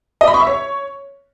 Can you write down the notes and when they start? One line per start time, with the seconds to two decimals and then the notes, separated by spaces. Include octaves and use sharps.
0.21 D#5
0.27 B5
0.34 C#6
0.40 E5
0.47 C#5